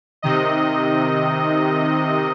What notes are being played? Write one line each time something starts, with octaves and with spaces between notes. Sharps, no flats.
C3 D#3 D#5